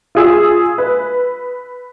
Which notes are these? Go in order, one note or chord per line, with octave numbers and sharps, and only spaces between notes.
F4 G#4 E6
B4